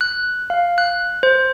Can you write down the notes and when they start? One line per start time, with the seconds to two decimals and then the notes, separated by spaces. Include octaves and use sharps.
0.01 F#6
0.50 F5
0.78 F#6
1.23 C5